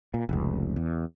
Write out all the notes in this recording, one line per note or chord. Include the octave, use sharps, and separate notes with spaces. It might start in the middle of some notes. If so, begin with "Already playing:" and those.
A#2
F1 C#2
E2